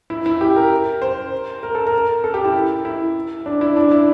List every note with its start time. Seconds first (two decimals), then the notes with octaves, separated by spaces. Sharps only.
0.10 E4
0.26 E4
0.41 G4
0.56 A#4
1.02 C5
1.63 A#4
1.75 A4
1.87 A#4
2.24 A4
2.34 G4
2.45 E4
2.85 E4
3.46 D4
3.61 E4
3.77 D4
3.91 E4